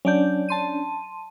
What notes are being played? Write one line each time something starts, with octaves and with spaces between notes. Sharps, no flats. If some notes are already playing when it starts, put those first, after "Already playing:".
F#3 C#4 D4 D5 G6
A5 C6 D#7